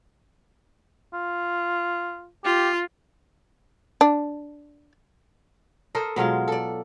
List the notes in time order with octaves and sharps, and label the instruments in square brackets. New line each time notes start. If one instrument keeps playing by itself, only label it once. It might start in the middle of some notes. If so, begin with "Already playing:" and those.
[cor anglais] F4
[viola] F4 [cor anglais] G4
[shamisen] D4
[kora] A4 A#4 C5 D#5
B2 F#3 G#3 F4
A4 D5